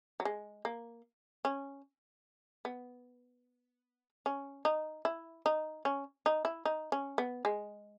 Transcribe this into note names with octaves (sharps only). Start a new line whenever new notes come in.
F#3
G#3
A#3
C#4
B3
C#4
D#4
E4
D#4
C#4
D#4
E4
D#4
C#4
B3
G#3